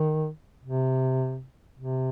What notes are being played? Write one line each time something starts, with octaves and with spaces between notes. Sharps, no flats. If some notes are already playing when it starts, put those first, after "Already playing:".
Already playing: D#3
C3
C3